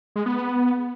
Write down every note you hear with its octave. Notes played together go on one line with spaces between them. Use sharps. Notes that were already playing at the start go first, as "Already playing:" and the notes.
G#3
B3
B3